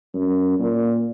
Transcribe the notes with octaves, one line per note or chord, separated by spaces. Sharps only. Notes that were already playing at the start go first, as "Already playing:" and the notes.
F#2
A#2